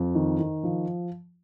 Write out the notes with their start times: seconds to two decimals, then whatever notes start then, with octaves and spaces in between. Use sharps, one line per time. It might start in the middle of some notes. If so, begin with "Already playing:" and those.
Already playing: F2
0.15 D#3
0.39 D#3
0.64 F3